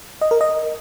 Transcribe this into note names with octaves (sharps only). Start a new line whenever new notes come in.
D#5
A#4
D#5